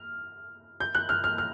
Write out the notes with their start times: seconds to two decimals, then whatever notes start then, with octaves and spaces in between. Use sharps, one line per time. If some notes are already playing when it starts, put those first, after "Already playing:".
Already playing: F6
0.80 G6
0.95 F#6
1.09 F6
1.24 F6
1.38 F6